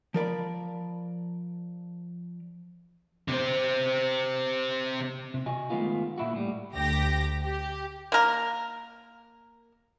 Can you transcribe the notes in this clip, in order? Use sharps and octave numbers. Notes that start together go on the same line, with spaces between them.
F3 A#4 D5 B5
C3 C4
C3
F#4 D#5 G#5
D#3 G#3 A3 B3 F4
A#2 E4 F#4
A2 G3
D2 G4 A#6
G4
A#3 A#4